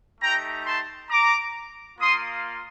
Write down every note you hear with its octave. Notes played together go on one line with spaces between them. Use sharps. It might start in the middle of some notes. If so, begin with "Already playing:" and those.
A3 D#4 G4 G5 A#5
A5 C6
A#5 D6
A#3 F4 C6 D#6